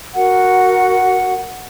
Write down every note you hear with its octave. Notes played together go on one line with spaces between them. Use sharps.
F#4 A#4 F#5